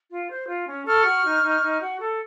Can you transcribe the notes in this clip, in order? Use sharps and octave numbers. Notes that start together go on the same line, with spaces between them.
F4
C5
F4
C#4
A4 C#6 F6
F#4
D#4
D#4
D#4
F#4
A4